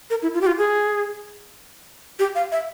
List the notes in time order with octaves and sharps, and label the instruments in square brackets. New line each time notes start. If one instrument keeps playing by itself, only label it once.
[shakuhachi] A#4
E4
F4
G4
F4
G#4
G4
F5
E5